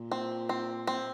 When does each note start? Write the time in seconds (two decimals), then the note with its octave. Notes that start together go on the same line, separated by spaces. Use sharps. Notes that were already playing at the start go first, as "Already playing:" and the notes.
Already playing: A#2
0.11 C4
0.49 C4
0.87 C4